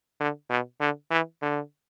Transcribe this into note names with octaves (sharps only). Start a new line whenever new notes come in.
D3
B2
D3
E3
D3